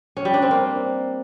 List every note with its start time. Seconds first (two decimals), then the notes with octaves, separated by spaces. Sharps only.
0.17 C#4
0.25 G3
0.34 D4
0.42 C4
0.51 A#3